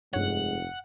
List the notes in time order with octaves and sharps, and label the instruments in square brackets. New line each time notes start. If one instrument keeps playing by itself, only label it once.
[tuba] F1 [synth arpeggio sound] G2 C#5 [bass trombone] G#3 [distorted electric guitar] F#5